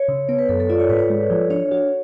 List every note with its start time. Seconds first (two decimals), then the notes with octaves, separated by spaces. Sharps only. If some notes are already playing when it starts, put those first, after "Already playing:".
Already playing: C#5
0.08 C#3
0.29 B3 C#5
0.39 B4
0.49 F#2 A4
0.60 A4
0.69 F4 D5
0.79 C#5
0.89 G#2 B4
0.99 C#5
1.10 G#3
1.30 F3
1.50 D4 C#5
1.71 F#4